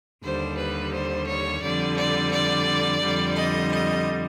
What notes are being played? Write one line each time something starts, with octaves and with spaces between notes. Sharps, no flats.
D#2 D3 G3 C5
B4
C5
C#5
F2 D3 G3 D5
D5
D5
F2 D3 G3
D#5
D#5